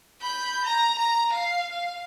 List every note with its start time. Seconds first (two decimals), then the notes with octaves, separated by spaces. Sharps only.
0.21 B5 G6
0.64 A#5
0.98 A#5
1.33 F5
1.72 F5